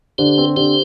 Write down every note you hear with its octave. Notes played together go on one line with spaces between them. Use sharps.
D3 G4 C5
C4
D3 G4 C5